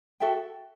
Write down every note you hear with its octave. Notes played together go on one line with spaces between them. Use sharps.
F#4 A4 E5 G5